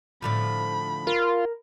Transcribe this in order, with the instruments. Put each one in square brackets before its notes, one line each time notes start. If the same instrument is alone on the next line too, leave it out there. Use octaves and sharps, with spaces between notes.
[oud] A2 D3 F3 [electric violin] B5
[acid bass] F4 [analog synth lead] A#4